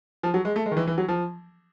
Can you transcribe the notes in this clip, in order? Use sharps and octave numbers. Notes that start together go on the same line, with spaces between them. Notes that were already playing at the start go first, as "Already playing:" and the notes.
F3
F#3
G#3
A3
G#3
D#3
E3
E3
F#3
F3